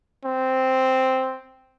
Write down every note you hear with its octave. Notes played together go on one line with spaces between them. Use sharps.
C4